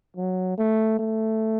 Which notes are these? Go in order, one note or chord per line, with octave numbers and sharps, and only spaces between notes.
F#3
A3
A3